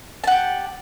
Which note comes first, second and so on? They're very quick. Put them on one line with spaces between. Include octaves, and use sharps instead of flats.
A5 F#5 G4